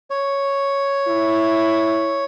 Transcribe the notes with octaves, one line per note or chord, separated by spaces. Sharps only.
C#5
E4